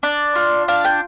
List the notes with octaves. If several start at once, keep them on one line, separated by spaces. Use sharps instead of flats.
D4 D5
F4
D4 F5
G5